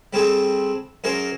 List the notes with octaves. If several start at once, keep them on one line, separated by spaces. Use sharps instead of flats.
G3 C4 G#4 A4
F#2 G#4 A#4 C5